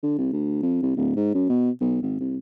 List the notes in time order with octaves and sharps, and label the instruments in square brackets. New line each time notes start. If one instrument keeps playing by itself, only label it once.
[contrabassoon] D3
C2
D2
F2
C2
D1
G#2
F#2
B2
B1
G#1
C2